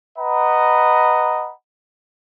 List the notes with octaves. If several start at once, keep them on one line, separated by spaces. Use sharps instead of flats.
B4 D#5 F#5 A#5 B5